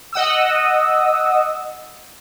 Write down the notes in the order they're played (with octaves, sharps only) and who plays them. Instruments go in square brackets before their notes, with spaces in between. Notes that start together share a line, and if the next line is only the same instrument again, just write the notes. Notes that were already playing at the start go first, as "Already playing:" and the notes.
[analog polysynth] D#5 F#5 D#6 E6